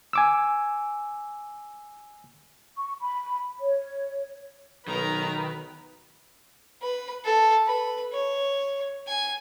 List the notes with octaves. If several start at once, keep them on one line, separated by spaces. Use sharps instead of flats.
G#5 D6 E6
C#6
B5
C#5
B1 D#3 A#4 B4 A#5
B4
A4
B4
C#5
G#5